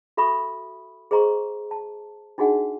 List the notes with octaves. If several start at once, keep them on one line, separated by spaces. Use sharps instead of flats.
F#4 A4 E5 B5 C#6 D#6
G#4 C5 D#5 A#5 C6 C#6
A5
D4 D#4 F#4 G#4 D#5 F#5